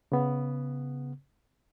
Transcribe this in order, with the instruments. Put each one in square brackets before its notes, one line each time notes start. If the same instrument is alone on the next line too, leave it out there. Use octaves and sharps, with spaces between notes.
[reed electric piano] C#3 B3